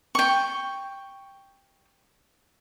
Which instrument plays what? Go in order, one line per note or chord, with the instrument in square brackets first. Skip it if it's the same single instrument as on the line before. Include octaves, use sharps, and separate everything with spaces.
[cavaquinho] G5 C#6